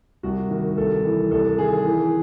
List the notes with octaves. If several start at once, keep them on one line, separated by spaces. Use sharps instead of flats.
C2 F#4
D#3
C2 A4
E3
C2 A4
D#3 G#4
E3